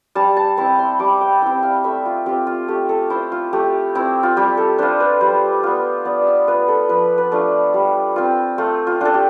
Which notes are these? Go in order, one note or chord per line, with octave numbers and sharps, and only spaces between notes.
G3 A5
A5
C4 E4 B5
C6
G3 D6
G5
C4 E4 G5
F5
A3 E5
F4
C4 F4 G4
F4
A3 G4
A4
E4 C5
F4
A3 G4
C4 E4
F4
G3 G4
A4
D4 F4 C5
B4
G3 C5
B3 F4
B3 D5
E5 F5
F4 B4
A4
F3 B4
B4
A3 D4 F4
G3
C4 F4
A3 F4
F4
D4 F4 A4
G4